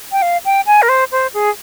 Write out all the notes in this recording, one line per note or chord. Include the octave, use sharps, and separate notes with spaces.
G5
F5
G5
G#5
A#4
C5
C5
G#4